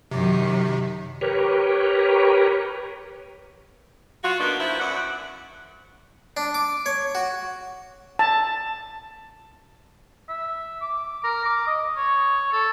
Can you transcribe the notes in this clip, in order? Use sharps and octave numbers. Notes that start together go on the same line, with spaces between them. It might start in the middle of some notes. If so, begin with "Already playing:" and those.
F#2 C3 D#3
G4 A#4 B4 C#5
F4 F#4
F#3 A#3 B3 D4 D#4
F3 E4
F#2 D5 F#5
D4
D6
C#5
F#4
A5
E5
D6
A#4
D6
D#5
C#5
A4